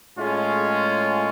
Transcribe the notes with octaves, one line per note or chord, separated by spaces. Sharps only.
A2 G#3 C#4 F4